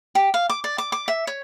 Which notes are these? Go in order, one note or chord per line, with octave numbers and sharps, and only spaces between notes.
G4
F5
D6
D5
D6
D6
E5
C#5